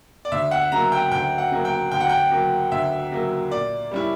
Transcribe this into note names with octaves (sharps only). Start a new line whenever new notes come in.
D5
D2 E5
F#5
C#3 F#3 A#3 A#5
G5
D2 G5
F#5
C#3 F#3 A#3
G5
D2 G5
F#5
G5
C#3 F#3 A#3
D2 E5
C#3 F#3 A#3
A#2 D5
G3 C#4 E4